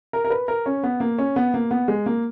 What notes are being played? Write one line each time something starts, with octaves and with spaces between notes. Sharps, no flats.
A#4
A#4
B4
A#4
C#4
B3
A#3
C#4
B3
A#3
B3
G#3
A#3